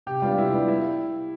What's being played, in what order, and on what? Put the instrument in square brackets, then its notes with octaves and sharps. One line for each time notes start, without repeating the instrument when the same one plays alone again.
[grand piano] C3 [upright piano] G4
[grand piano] G3 B3 D4 [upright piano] F4
[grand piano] C3 [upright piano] E4
[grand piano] G3 B3 D4
[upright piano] E4